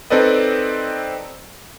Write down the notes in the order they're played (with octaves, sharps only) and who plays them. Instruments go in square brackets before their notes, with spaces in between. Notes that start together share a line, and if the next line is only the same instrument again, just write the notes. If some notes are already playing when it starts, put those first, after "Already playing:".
[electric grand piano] C4 D#4 A4 B4 D5 D#5